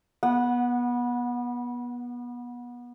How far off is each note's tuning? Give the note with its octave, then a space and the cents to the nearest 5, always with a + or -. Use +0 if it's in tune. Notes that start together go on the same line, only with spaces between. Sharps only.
B3 -25 F#5 +0